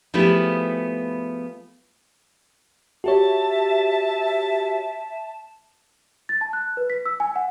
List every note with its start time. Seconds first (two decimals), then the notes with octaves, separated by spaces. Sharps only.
0.14 F3 A3 B3 E4 G4 G#4
3.04 F#4 G4 C#5 E5 A5
6.29 A6
6.41 A5
6.53 F#6
6.77 B4
6.90 B6
7.06 E6
7.20 G#5
7.36 F#5